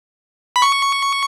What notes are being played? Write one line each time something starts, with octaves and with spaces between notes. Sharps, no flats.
B5
C#6